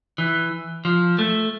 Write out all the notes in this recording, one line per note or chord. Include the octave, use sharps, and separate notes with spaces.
E3
F3
A3